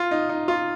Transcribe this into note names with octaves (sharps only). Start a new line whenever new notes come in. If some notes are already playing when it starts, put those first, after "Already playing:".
Already playing: F4
D#4
D#4
F4